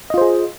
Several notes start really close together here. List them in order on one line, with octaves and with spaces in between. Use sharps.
D#5 F4 C5 G#4